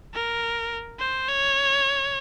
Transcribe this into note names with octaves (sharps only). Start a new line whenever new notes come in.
A#4
C5
C#5